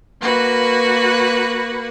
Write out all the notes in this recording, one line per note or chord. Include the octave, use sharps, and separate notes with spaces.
A#3 F#4 B4